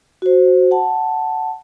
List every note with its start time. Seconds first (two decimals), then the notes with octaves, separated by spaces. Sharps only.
0.22 F#4 C5
0.71 F#5 A5